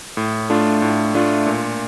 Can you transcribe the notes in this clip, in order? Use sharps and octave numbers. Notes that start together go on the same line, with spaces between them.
A2
A3 D4 F4
A2
A3 D4 F4
A#2